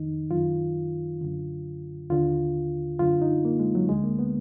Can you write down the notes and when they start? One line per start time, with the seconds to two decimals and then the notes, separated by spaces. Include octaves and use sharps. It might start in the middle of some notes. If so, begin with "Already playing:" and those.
Already playing: F2 D#3 D#4
0.31 F#2 D#3 F4
1.21 F#2 D3
2.10 D#2 D3 F4
2.99 F#2 D3 F4
3.22 D#4
3.45 A#3
3.59 G#3
3.75 F#3
3.89 D2 D3 G#3
4.04 A#3
4.19 B3